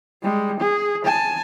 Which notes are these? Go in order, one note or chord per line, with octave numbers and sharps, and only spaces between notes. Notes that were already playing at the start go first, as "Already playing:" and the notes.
G3 G#3
G#4
G#5 A5